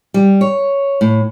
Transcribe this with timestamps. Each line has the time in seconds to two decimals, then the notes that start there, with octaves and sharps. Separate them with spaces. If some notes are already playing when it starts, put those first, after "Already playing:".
0.14 G3
0.41 C#5
1.01 A2